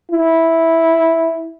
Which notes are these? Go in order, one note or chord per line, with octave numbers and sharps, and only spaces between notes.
E4